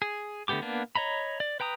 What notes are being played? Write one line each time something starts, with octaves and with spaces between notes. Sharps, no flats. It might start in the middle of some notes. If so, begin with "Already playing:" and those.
G#4
D3 A3 B3 G4 D6
A#3 B3 D4
C#5 D#5 A#5 B5
D5
B4 G5 A#5 D#6